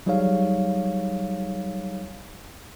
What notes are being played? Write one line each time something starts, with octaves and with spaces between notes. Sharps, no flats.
F#3 G3 D#4 G#4 C#5 F5